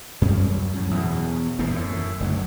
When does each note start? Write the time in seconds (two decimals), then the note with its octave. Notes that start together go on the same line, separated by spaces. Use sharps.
0.22 F#2 G3 C#4
0.74 F#2 A2
0.91 E2 B2
1.59 D#1 E2 G#2 B2
1.70 F#2 A2
2.20 F#1 D2 F#3